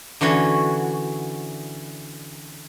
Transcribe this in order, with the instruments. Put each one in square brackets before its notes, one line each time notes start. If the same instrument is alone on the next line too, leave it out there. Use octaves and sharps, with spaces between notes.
[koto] D3 E3 C#4 F#4